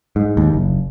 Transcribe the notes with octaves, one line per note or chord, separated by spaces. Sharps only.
G#2
D#2
F#1